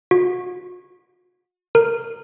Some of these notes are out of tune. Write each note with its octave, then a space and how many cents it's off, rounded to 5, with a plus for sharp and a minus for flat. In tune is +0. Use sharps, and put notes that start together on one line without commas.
F#4 -40
A#4 -20